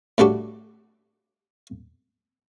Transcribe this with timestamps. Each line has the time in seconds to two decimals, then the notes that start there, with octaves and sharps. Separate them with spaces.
0.18 A2 C#3 G3 D4 F#4 G4